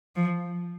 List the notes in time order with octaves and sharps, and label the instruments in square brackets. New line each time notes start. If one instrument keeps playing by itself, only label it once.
[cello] F3